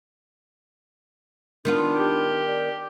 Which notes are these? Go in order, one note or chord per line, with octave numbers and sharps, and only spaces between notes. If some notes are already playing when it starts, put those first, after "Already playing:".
D#3 B3 D4 F4
G4
D5